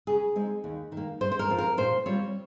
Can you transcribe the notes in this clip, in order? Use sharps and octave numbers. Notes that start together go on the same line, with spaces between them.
C#3 G#4
G#3 C4 D#4
D#2
D#3
A#3
G2 C5
C5
A#4
F3 C4 F4
A#4
A#2 C5
G3 C4 F4 C#5